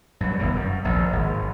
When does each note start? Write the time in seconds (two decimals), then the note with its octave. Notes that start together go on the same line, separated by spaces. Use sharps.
0.21 G2 F#3
0.39 F1 E2 D#3
0.55 F#2
0.84 A#1 D#2
1.13 G#1